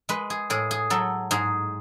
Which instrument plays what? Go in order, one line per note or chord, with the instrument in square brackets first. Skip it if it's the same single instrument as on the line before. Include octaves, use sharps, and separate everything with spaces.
[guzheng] G#3 B4
G#4
A2 G#4
G#4
F#3 A4
G#2 G#4